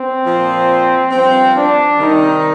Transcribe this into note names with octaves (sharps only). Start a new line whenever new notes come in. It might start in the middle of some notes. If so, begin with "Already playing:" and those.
Already playing: C4
A#2 F3
G2 F3 C4
D4
C3 D#3 G3 D#4